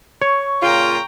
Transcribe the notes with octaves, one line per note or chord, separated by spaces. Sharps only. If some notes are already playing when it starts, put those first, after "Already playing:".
C#5 C#6
A#2 C#3 F4 G5 A#5